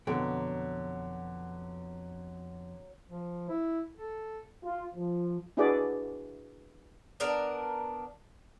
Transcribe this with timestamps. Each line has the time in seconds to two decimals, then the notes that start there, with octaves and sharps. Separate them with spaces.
0.07 F2 B2 D3 F#3 G5
3.08 F3
3.49 E4
3.97 A4
4.64 F4
4.94 F3
5.57 D4 E4 F#4 G#4 B4 D5
7.20 B3 D4 A#4